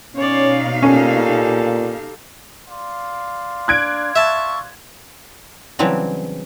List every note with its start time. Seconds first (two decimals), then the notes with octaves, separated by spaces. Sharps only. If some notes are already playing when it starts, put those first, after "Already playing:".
0.16 B2 C#4 D#4 C#5 D5 F5
0.82 A#2 C#4 G4 A4
2.68 D5 F5 C6
3.68 D4 F#6 G#6 D7
4.16 E5 A5 C#6
5.79 C#3 E3 F#3 G3 C4 D4